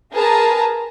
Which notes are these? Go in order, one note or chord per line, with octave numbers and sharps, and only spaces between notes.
G#4 A#4 B4 A5 A#5